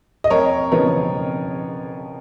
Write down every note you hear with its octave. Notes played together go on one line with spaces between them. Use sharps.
D#5
F2 A#4 C#5
C#3 F3 B3 D#4 A#4 C#5
F2